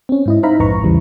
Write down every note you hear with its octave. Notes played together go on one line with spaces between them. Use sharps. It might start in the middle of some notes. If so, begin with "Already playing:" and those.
C4 C#4
G#2 E4 D#5
D#4 C5 E5 F5 A#5 B5
A#1 F2 G#2 B4 A#5 C#6
A#1 E2 C#3 E3 G3